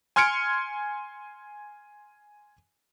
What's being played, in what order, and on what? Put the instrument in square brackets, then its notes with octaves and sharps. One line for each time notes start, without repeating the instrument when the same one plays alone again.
[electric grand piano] G#5 C6 F6 G#6 C#7 D7